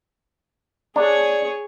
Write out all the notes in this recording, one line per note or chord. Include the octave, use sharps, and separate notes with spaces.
D4 G#4 C#5